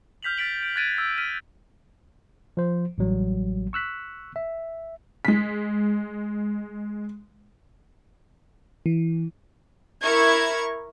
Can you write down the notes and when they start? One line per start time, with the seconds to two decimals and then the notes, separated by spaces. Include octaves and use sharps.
0.23 F6 G6 B6 F7 F#7
0.38 F6 A6 B6 D7 F#7
0.63 D7
0.76 F#6 G#6 A6 D7 D#7
0.98 E6 B6
1.18 F6 B6 D#7
2.57 F3 C5
2.98 A1 F#3 G3
3.73 C#6 E6 F#6 B6
4.36 E5
5.25 G#3 B6
8.86 E3
10.02 E4 A#4 C#6 G#6